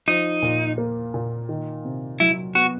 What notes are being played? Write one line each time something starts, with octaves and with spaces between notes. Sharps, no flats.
F3 D#4
A#2
A#3
A#2
D#3
C3
F#3 E4
B3 F#4